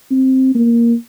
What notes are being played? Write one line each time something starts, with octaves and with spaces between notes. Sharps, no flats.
C4
A#3